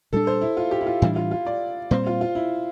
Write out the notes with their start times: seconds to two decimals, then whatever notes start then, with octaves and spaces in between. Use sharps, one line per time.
0.13 A#2 G3 D4 A4
0.27 C5
0.41 E4
0.57 F4
0.71 G4
0.81 E4
0.86 F4
1.01 A2 E3 G3 D4 E4
1.16 F4
1.31 F4
1.46 D5
1.91 A#2 G3 C4 C5
2.07 F4
2.21 F4
2.35 E4